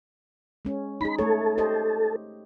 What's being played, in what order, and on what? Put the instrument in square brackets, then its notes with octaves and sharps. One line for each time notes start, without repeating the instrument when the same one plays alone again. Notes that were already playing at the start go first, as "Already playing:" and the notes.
[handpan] G#3 C#4
[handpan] D#4 G#4 [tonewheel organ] B5
[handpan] A3 C#5 [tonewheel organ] A4
[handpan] G4 C5 D#5